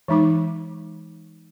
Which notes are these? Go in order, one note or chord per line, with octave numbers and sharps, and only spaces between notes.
E3 G#3 D#4 D6